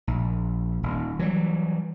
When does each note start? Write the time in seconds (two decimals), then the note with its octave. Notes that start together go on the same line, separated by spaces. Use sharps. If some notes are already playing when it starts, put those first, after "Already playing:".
0.07 A#1
0.83 D#1
1.19 E3 F#3 G3